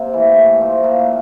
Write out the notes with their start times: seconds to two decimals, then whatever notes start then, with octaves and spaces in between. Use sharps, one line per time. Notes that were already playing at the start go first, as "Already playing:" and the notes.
Already playing: C3 A#3
0.13 E3 A3
0.38 G2
0.61 F3 A3
0.83 A#2 A#3
0.99 A3